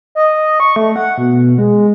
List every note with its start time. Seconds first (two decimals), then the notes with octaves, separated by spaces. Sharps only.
0.15 D#5
0.60 C#6
0.76 A3
0.96 F#5
1.18 B2
1.58 G#3